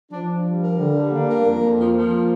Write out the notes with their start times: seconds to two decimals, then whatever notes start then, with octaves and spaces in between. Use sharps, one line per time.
0.12 F3 D4
0.29 D4
0.46 G3
0.62 A#4
0.78 D3 G3
0.96 G3
1.12 A#3 D4
1.29 A#4
1.45 F2 A#3
1.62 F2
1.79 F3
1.95 F3